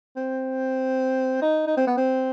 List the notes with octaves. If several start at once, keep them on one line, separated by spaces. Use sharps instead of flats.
C4
D#4
D#4
C4
B3
C4